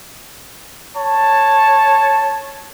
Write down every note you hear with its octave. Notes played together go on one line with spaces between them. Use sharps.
C#5 A5